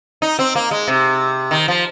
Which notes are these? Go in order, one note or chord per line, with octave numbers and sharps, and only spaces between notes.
D#4
C4
A#3
G#3
C3
D#3
F3